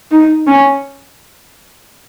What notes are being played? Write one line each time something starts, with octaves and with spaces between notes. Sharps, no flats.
D#4
C#4